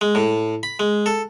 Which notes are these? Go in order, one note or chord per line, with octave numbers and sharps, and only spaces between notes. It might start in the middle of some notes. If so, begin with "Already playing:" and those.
G#3
A2
B5
G#3
A4